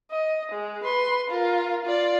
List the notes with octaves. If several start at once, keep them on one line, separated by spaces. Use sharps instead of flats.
D#5
G#3
B4 C6
F4 A#4
F4 D5